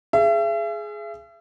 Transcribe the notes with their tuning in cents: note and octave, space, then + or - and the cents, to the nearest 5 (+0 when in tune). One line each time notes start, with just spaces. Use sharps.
G#4 +10 E5 +40